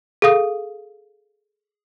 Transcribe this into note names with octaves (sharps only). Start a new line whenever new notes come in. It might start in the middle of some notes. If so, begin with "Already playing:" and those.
G#4 A4 F5 D#6